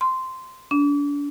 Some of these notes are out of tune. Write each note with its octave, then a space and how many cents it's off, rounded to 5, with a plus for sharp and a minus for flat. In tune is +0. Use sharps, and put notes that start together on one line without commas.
C6 -10
D4 -35